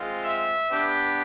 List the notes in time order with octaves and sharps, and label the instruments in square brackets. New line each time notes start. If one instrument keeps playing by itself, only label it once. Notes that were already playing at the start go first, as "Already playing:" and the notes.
Already playing: [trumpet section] G#3 C4 F4
E5
B3 D4 G4